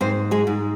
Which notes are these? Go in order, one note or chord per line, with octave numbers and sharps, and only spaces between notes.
G#2 C4 C5
G#3 G#4
G#2